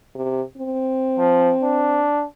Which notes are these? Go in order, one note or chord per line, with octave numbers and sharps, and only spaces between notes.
C3
C4
F3
D4